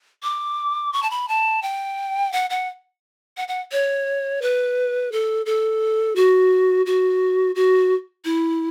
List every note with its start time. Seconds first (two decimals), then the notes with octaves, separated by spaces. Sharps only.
0.23 D6
0.93 C#6
1.03 A5
1.11 B5
1.28 A5
1.62 G5
2.32 F#5
2.50 F#5
3.37 F#5
3.48 F#5
3.72 C#5
4.42 B4
5.12 A4
5.46 A4
6.16 F#4
6.86 F#4
7.55 F#4
8.25 E4